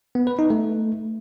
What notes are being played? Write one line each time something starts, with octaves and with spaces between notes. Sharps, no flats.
B3
B4
D#4
A3